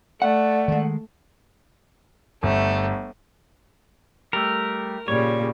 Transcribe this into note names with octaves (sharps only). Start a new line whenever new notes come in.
A3 D5 F#5
D#3 G#3
G1 A3
G3 A3 A#4
A#2 C#3 G3 C#5